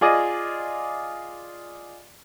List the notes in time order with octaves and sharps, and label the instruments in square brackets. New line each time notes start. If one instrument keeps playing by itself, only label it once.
[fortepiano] F4 G#4 D5 D#5